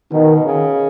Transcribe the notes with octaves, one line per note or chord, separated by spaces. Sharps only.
B2 D#3
C#3